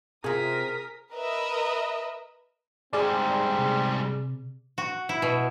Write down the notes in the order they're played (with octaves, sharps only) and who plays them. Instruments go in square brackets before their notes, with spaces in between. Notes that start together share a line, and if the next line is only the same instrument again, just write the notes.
[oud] C3 F4 [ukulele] G#4 [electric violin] A#4 [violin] D#6 B6
[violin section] A#4 B4 D#5 E5
[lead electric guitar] G#2 G3 [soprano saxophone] C4 [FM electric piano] G#4 D5
[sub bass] C3
[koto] F#4
E4
B2